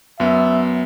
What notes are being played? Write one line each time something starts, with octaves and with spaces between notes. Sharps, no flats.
F#2 B3 E5